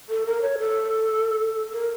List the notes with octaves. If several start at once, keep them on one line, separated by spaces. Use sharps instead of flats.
A4
A#4
C#5
A4
A#4